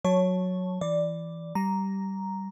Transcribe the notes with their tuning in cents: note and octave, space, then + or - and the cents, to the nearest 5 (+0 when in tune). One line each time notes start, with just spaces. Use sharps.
F#3 -15 C#5 +0 A5 +0
E3 +5 D5 +0
G3 -15 A#5 +0